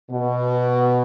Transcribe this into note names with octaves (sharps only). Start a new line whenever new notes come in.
B2